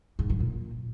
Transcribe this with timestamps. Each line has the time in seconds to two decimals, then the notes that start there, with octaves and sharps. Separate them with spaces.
0.19 G#2
0.30 F#3
0.40 A#2